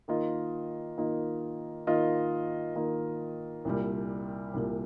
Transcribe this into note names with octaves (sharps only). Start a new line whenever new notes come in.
D#3 A#3 F4 D#5
D#3 A#3 F4 D#5
D#3 A#3 F4 D#5
D#3 A#3 F4 D#5
C2 A#2 G3
C2 A#2 G3